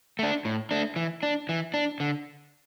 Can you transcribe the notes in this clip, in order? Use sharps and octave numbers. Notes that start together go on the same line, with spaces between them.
A3 D4
A2
A3 D4
E3
D4
E3
D4
D3